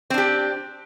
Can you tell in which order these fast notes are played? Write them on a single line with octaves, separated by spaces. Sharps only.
C4 D4 G4